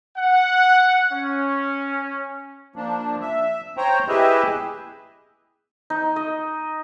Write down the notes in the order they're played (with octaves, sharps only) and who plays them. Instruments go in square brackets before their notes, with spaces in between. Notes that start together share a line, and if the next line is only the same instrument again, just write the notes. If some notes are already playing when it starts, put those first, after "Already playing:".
[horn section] F#5
C#4
[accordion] F3 A#3 D4
E5
C5 C#5 G5 A#5
E4 G4 G#4 B4 D#5 E5
[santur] D#4
D#5